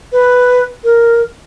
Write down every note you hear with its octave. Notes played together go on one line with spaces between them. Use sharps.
B4
A#4